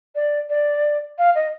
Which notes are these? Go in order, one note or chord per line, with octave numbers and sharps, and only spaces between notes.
D5
D5
F5
D#5